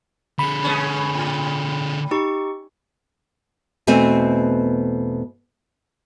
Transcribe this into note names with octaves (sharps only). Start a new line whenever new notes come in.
D3 G#4 B5
G#3 B3 C#4
A2
D#4 G4 C#6
E2 B2 A3 C4 G#5